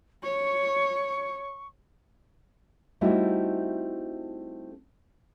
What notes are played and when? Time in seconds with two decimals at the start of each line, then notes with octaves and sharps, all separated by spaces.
0.23 C#5 C#6
3.01 G3 A3 C4 D#4 E4 F#4